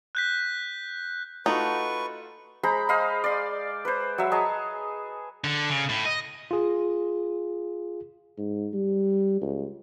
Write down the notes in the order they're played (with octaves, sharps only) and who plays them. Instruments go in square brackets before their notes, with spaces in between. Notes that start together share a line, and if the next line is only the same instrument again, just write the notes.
[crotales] F#6 G6 B6
[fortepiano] A3 F4 F#4 [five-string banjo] D#4 [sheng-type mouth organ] B4 C#6 [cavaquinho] F#5 A5
[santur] G#3 C5 A#5 B5
C5 D#5 F5 B5
D5 C6
B4 C5
F#3 E5
G#4 C#5 D#5 A5
[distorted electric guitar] D3
C#3
A2
D#5
[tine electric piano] F4 G#4
[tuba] G#2
G3
C#2